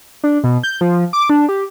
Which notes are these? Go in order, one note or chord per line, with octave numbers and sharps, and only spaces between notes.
D4
B2
G6
F3
D6
D4
G4